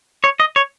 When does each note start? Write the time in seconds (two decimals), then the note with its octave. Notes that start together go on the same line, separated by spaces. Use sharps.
0.24 C#5
0.40 D#5
0.56 C#5